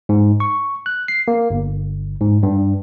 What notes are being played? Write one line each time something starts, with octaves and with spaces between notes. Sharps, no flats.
G#2
C#6
F#6
C7
A#3
G1
G#2
G2